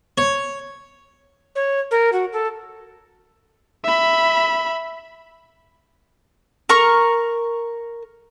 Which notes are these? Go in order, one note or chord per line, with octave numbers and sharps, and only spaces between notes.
C#5
C#5
A#4
F#4
A4
E5 B5
A#4 C#6